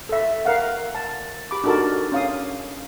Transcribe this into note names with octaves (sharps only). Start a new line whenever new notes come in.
A4 E5
A#4 F5 F#5
A5
G4 B5 D6
D4 D#4 F#4 A4 A#4 A5
C#4 F5 D#6